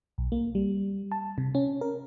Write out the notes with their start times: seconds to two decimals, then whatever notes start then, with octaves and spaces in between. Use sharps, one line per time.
0.18 B1
0.32 A#3
0.55 G3
1.12 A5
1.38 C3
1.55 C#4
1.81 A#4